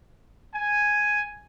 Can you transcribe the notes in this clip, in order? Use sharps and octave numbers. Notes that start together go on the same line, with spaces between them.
G#5